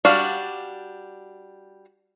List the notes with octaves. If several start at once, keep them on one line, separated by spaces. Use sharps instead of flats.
G3 D4 F#4 F5